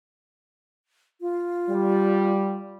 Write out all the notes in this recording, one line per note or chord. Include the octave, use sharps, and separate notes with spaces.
F4
G3